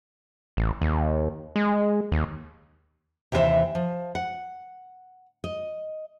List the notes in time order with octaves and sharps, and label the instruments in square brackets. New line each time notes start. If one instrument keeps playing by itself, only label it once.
[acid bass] A1
D#2
G#3
D#2
[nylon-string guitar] D#2 C3 E3 F4 C5 E5
F3
F#5
D#5